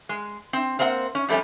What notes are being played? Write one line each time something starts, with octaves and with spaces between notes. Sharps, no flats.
G#3
C4
A#3 C4 C5 E5 F#5
C#4
F2 G3 A3 C4 C#4